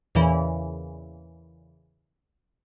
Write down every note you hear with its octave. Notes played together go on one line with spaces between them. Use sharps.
E2 A#2 C#3 E3